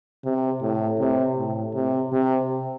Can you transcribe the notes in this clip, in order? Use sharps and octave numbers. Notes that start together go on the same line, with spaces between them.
C3
A2
C3
A2
C3
C3